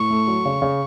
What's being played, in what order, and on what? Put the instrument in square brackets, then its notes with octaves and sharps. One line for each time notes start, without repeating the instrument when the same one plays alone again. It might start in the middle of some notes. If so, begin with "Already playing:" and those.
Already playing: [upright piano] A2 [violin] C#6
[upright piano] A3
F#3
C#3
C#3